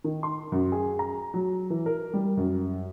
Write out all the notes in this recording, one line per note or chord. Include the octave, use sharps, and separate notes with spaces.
D#3
C6
F#2
G#4
A#5
F#3
E3
A#4
G3
F#2